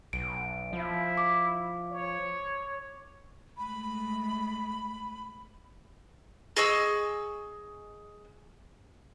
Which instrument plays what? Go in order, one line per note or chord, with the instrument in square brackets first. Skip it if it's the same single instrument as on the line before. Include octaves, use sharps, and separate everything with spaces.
[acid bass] B1 [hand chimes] D7
[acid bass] F3 [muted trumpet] E4
[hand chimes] D6
[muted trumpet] C#5
[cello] G#3 A3 [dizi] B5
[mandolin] G#4 D#5 C#6 E6